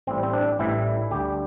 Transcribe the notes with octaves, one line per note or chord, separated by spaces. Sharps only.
A1 A2 E3 G3 C4
C4
D4
A1 A2 E3 G3 E4
D2 D3 G3 G4